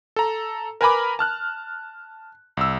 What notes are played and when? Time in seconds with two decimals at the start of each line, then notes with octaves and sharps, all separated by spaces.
0.16 A4 A#5
0.81 A#4 B4 G#5 A#5 B5 D6
1.19 A5 F6 F#6
2.57 C2 E6